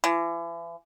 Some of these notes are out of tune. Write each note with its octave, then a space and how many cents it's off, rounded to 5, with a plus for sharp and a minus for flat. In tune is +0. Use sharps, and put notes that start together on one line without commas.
E3 +40